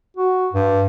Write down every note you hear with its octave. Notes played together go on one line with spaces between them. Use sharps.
F#4
G2